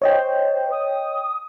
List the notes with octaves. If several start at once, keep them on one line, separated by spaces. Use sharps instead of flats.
C5 C#5 D#5 G5
D#6